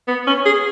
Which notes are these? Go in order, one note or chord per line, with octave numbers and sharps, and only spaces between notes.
B3
C#4
G#4